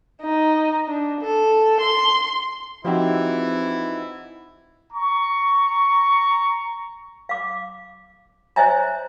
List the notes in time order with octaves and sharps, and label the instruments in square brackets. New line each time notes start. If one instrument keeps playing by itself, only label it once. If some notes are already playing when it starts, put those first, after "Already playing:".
[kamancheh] D#4
D4
A4
C6
[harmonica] E3 E4 [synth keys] F3 C4 [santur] D#4 F#4 G4
[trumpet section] A#5 C#6
[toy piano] F5 D6
C5 C#5 D#5 E5 G#5 A#5